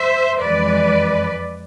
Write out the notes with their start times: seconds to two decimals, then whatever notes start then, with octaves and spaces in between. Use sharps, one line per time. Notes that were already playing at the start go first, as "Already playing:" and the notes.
Already playing: C5 E5
0.40 F2 E3 G#3 B4 D5